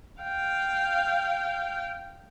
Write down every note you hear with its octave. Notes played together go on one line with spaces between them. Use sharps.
F5 G5